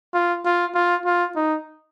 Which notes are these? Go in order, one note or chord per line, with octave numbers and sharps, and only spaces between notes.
F4
F4
F4
F4
D#4